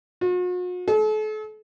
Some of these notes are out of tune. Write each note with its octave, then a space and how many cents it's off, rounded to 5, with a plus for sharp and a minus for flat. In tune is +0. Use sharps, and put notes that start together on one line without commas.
F#4 -45
A4 -40